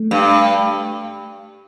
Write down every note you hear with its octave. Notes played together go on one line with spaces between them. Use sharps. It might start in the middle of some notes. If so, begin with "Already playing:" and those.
Already playing: A3
G2